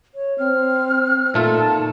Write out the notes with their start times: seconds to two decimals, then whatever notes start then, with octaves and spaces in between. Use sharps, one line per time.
0.15 C#5
0.39 C4 F6
1.34 A#2 A3 D#4 F4 A4
1.53 A5